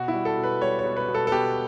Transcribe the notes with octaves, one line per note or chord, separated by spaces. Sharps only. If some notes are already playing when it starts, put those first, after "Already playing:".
Already playing: B2 F#4
E4
G3
A4
B2
B4
G3 C#5
C#5
B2
B4
B2
A4
A4
B2 G4